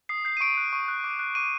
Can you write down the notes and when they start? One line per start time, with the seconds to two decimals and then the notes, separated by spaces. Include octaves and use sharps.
0.09 D#6 C7
0.25 G6 C7
0.37 D#7
0.40 C#6 D7
0.57 F#6
0.73 C#6
0.88 F#6
1.04 D6
1.19 F#6
1.35 D6 D#7